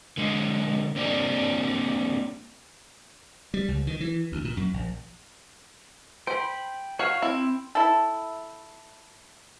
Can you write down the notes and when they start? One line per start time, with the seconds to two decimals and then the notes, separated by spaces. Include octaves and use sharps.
0.17 D3 G#3
0.96 A#3 C4 D4 G4 C#5 D5
3.54 G3
3.68 C#2
3.87 D#3
4.00 E3
4.32 D2
4.45 A#2
4.57 F#2
4.74 A#1
6.27 C5 G5 B5
6.99 F#4 C#5 F5
7.22 C4 E4
7.75 E4 A4